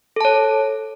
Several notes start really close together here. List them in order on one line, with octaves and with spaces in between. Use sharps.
A4 A5 C#5